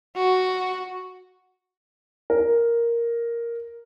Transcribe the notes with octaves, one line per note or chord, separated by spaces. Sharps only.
F#4
A#4